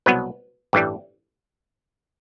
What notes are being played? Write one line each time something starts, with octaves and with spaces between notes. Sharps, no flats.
C2 B2 F#3 B3 B4
A1 G2 E3 G3